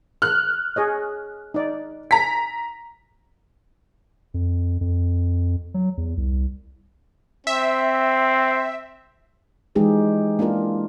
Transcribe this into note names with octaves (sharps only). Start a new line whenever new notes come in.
F6 F#6
G#4 C#5 D#5
D#4 D5
G#5 A#5 B6
F2
F2
F#3
E2
C2
C4 E5
E3 F3 G#3 D#4 G4 G#4
A#3 D4 E4 F4 A#4